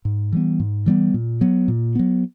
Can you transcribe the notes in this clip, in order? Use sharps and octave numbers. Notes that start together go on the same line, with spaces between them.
G#2
E3 G3 B3
G#2
E3 G3 B3
A#2
F#3 B3
A#2
F#3 B3